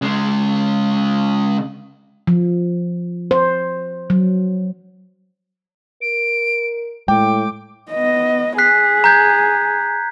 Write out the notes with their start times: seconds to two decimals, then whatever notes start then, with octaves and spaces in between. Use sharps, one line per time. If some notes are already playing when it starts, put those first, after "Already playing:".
0.02 C#3 G#3
2.27 F3
3.31 C5
4.10 F#3
6.02 A#4 D7
7.08 A2 G#3 G5 D6
7.91 B3 D#5
8.58 G#4 F#6 B6 C7
9.04 A#5 G6 G#6